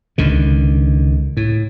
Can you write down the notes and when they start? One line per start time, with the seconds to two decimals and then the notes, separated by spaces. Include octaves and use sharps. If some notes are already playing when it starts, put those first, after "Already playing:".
0.18 C#2 D3 D#3
1.37 A2